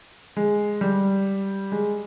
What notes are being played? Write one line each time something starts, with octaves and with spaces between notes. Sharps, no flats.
G#3
G3
G#3